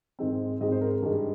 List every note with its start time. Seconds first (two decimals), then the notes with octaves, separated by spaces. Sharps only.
0.19 G#2 D#3 G#3 C4
0.61 G#2 D#3 G#3 C4 D#5
0.72 C5
0.81 A#4
0.92 A#4
1.02 G2 D#3 G#3